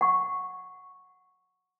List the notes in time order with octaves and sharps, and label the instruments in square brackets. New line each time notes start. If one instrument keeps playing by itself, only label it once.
[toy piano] F#5 C#6